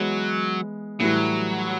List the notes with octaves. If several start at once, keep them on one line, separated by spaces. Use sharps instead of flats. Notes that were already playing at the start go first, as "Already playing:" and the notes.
Already playing: E3 F#3 G#3 B3
A2 E3 F#3 G3